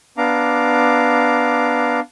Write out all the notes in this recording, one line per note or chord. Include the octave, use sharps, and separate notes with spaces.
B3 D4 F5 A#5 D6